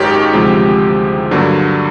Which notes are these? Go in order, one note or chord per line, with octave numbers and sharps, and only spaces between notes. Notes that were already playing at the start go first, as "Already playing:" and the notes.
Already playing: G#1 F#2 D#3 G#3 G4 C#5
D2 C3 F3 G#3
G2 D3 F#3 A#3